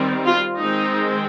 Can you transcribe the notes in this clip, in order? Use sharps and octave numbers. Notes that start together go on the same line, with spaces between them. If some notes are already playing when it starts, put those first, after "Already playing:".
Already playing: D#3 G3 C4
F4
D#3 G#3 C4 D#4